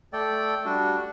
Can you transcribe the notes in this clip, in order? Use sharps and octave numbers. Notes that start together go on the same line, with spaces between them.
A3 A4 D5 G5
G3 D4 F#4